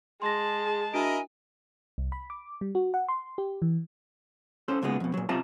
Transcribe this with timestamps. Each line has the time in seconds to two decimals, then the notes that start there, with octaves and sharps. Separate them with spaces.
0.22 G#3 G#4 A5 C6 A#6
0.94 D4 E4 F#4 A#4 D#5 G#5 D7
1.98 C2
2.12 B5
2.30 D6
2.61 G3
2.75 F#4
2.94 F#5
3.09 C6
3.38 G4
3.62 E3
4.68 C#4 A4 C5
4.82 B1 A#2 C#3 G#3 B3
5.00 F2 B2
5.14 A#2 F#3
5.29 F#2 C3 F4 D#5 A5 A#5